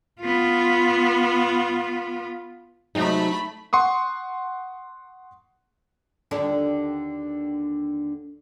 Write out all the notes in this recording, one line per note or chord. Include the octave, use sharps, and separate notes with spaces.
B3 F4
C3 F#3 G#3 A3 D#4 B5
F#5 C6 C#6 D#6
D#2 D3 D4